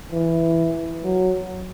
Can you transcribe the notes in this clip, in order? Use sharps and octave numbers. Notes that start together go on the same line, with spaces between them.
E3
F#3